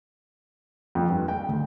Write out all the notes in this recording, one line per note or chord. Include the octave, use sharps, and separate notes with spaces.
F2
G2
G5
D2